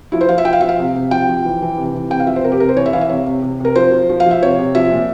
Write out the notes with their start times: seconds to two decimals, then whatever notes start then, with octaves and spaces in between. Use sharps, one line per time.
0.12 F3 E4
0.21 C5
0.29 F3 F5
0.38 E5
0.45 F3 G5
0.53 F5
0.61 F3 E5
0.69 F5
0.79 C3
0.95 C3
1.11 F3 G5
1.29 F3
1.45 E3
1.62 E3
1.77 C3
1.94 E3
2.10 C3 G5
2.20 F5
2.27 F3 E5
2.36 C5
2.44 C3 A#4
2.52 G4
2.60 C3 A#4
2.69 C5
2.76 E3 C#5
2.86 E5
2.93 E3 F5
3.01 E5
3.09 C3 C#5
3.26 C3
3.42 C3
3.60 C3 A#4
3.75 F3 C5
3.92 F3
4.09 F3
4.20 F5
4.26 F3 E5
4.42 C3 C#5
4.58 C3
4.75 F3 E5
4.91 A#2